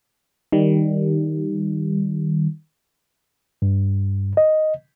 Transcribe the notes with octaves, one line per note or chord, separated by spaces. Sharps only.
D#3 G3
G2
D#5